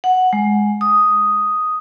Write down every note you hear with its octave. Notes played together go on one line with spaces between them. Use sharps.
F#5
G#3
D#6